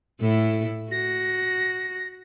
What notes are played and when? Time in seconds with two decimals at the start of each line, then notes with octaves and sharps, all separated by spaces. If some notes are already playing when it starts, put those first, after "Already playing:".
0.21 A2 E4 A4
0.91 F#4 A#6